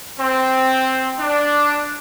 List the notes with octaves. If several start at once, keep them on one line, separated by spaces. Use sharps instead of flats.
C4
D4